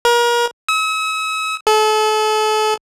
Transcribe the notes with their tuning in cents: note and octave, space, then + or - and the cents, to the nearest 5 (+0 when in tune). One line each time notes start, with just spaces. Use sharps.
A#4 +35
E6 -45
A4 -35